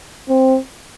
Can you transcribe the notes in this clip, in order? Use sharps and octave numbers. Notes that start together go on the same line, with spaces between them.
C4